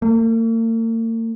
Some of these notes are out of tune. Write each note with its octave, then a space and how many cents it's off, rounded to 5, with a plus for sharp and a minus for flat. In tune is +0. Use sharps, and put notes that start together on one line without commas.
A#3 -45